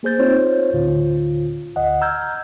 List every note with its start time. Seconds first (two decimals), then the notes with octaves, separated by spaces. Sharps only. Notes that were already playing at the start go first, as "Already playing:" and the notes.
0.03 A#3 G#4 C5 G6 A6
0.19 C4 D#4 F4 C5 C#5
0.73 D2 A2 D3 F4
1.76 D2 D#5 F#5
2.01 A#5 E6 F6 G6 G#6